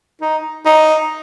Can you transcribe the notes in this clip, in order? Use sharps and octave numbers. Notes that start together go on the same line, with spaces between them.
D#4
D#4